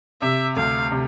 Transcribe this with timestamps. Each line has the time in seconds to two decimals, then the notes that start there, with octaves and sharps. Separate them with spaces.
0.21 C3 E5
0.56 D2 F5
0.92 C3